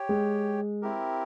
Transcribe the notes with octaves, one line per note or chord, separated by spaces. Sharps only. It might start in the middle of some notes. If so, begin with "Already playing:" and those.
Already playing: G4 C#5 G5
G#3
C4 E4 G4 A#4